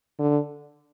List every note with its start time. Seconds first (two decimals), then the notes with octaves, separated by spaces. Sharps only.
0.19 D3